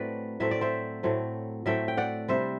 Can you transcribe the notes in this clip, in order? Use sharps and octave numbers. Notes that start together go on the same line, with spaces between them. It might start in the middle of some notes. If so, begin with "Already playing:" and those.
Already playing: A2 F#3 A3 C4 B4 D5
A2 F#3 A3 C4 E5
D5
C5 E5
A2 F#3 A3 C4
A2 F#3 A3 C4 E5 G5
G5
D5 F#5
C3 G3 D4 C5 E5